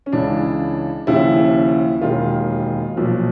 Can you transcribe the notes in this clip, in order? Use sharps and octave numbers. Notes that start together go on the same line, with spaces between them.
C#4
C#2 C#3 E3 D4
D#2 C#3 F3 E4
E1 D#2 D#3 F4
B1 A#2 F3